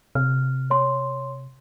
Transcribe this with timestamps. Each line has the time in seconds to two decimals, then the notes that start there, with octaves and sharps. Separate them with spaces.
0.15 C3 F6
0.70 C#5 C6